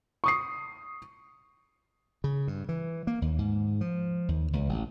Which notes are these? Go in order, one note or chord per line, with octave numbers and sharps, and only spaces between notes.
C#6 D#6 C7
C#3
G2
E3
A#3
D#2
G#2
F3
D#2
C#2
A1